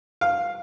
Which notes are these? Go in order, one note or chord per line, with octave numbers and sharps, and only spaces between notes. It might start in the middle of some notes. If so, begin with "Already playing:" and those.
F5